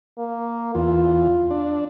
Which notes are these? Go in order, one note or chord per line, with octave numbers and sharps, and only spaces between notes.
A#3
E2 F4
D4